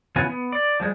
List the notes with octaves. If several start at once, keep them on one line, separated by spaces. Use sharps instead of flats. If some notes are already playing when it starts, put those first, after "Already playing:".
C#3 E3 B3 F4 F#4 G#5
B3
D5
F3 G3 G#3